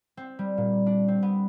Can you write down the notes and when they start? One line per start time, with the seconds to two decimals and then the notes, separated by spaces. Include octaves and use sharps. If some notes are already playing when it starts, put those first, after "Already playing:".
0.17 C4
0.39 G3
0.58 A#2
0.86 D4
1.08 C4
1.23 B3